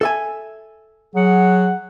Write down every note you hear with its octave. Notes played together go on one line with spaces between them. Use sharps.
A4 E5 G#5
F#3 G#4 F#5